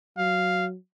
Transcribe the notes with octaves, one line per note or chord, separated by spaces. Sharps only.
F#3 F5